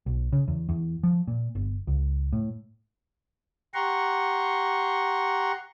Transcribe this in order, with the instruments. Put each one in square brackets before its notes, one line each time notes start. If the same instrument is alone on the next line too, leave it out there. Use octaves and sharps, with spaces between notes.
[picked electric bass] B1
C#3
E2
E2
F3
A#2
G1
C#2
A2
[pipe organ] G4 F#5 A#5 C6 C#6